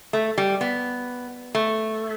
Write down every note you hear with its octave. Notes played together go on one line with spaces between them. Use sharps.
A3
G3
B3
A3